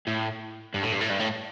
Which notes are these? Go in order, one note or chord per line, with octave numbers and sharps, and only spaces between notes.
A2
G2
A2
G2
A2
G2
A2